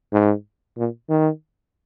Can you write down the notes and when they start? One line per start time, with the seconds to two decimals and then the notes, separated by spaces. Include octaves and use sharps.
0.13 G#2
0.78 A#2
1.09 D#3